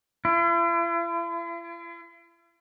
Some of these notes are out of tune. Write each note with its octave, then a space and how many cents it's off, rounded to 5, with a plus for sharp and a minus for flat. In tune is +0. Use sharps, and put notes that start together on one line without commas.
E4 +45